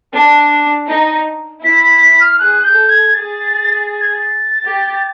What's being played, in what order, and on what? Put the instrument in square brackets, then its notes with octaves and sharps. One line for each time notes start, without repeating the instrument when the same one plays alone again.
[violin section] D4
D#4
[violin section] E4 [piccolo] B6
[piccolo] B6
B6
F6
[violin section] G#4 [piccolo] F#6
[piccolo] G6
[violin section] A4
[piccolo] G#6
[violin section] G#4 [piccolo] A6
[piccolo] A6
G#6
A6
[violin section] G4